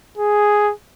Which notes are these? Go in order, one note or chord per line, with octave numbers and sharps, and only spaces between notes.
G#4